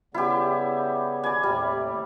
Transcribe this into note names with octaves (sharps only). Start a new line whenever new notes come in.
C#3 G3 B3 E4 G4
D5 G#5
D#2 A2 C3 G3